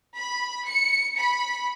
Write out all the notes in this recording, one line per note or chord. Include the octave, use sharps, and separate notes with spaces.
B5
C#7
B5